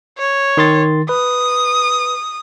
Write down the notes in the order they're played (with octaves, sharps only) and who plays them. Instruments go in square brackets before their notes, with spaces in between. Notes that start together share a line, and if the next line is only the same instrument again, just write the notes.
[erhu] C#5
[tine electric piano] D#3 C6 A6
[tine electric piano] B4 [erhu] D#6